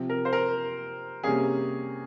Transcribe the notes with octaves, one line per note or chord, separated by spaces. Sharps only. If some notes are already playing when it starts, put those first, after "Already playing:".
Already playing: C3 F3 C4
A#4
C5
A#4
C3 G3 A#3 C#4 G#4